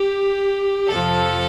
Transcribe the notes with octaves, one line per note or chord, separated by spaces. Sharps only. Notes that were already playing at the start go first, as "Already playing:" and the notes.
Already playing: G4
F2 C3 F3 A4